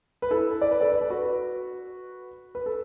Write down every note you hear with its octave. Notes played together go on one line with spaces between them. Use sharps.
B4
E4 A4
D5
B4
A4 D5
B4
A4
F#4 B4
B4
A4